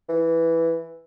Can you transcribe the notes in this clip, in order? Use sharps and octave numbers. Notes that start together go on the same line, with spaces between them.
E3